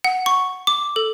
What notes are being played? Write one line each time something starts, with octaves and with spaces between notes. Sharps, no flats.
F#5
C#6
D6
A4